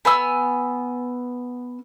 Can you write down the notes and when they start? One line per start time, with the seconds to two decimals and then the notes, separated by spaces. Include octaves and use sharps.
0.05 B3 G#5 E6